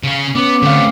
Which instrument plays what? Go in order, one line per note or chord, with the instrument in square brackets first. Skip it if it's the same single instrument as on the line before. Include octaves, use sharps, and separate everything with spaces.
[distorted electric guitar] C#3 C#4
[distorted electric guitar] B3 [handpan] C#4 [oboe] D6
[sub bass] D3 [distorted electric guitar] A3 B3 [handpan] C4 F5